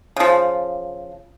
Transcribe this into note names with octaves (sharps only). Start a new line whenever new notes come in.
C#3 F3